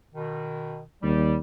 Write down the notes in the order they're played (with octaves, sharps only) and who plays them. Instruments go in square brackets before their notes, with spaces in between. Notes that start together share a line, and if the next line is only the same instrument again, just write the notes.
[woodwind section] B2 D#3
[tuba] D#2 [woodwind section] G3